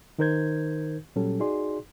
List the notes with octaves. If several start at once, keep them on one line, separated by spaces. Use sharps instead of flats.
D#3 D#4 A#4 C5 G6 G#6
A#2 F#3 G3 C#4 G4 A4
D#4 F#4 G#4 D5 C6